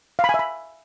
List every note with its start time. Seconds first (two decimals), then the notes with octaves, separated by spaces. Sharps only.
0.19 F5
0.24 B5
0.29 G#5
0.34 E5
0.39 B5